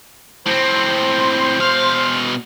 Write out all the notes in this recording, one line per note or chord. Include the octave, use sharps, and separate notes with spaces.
A2 C4 C5
B2 F5